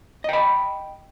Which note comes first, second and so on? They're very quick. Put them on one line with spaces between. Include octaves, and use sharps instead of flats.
D#5 G5 B5